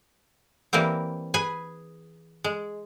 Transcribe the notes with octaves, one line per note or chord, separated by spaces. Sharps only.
E3 G3 A#3 C4
G#4 B4 G#5
G#3